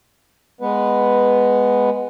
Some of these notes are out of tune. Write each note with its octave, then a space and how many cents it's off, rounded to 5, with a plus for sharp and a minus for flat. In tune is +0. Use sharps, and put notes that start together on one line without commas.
G#3 -10 B3 +0 B4 +0